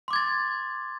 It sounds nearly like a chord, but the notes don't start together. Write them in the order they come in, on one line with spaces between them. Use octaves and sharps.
C6 D6 G#6 A6